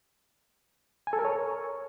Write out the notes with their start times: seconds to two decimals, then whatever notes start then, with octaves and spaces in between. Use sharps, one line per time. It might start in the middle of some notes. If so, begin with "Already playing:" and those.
1.07 G#5
1.13 A4
1.19 A#4
1.25 C#5